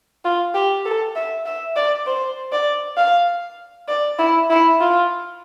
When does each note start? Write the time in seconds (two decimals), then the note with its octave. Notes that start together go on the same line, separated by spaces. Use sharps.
0.25 F4
0.54 G4
0.85 A4
1.15 E5
1.46 E5
1.76 D5
2.07 C5
2.52 D5
2.97 F5
3.88 D5
4.19 E4
4.50 E4
4.81 F4